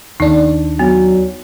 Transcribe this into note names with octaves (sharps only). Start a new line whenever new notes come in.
D#2 D4 D#4
F#3 B3